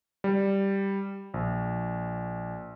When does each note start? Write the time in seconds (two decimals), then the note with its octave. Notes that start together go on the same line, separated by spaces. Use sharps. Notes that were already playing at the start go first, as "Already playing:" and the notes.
0.24 G3
1.34 A#1